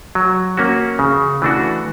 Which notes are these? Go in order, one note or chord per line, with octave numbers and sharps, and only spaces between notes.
F#3
A#3 C#4 F#4
C#3
E3 A3 D4 F#4